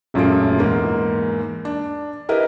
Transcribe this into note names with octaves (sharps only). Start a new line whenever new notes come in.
E1 F#2 A#2 A3 F4 D7
E2 G#2 A#3
D4
E4 G4 A#4 B4 D#5